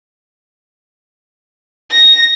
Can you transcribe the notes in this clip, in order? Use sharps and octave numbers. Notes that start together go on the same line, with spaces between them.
A#6